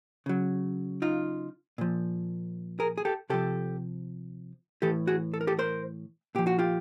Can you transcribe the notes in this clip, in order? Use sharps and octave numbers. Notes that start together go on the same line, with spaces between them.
C#3 F#3
D#4 F4
A#2 F3
G#4 A#4
G#4
G4 A4
C3 F3 G4 A4
A2 E3 G4 A4
F#4 G#4
A4
A#4
G4 A4
A#4 C5
A#2 F3 G4
F#4
F4 G4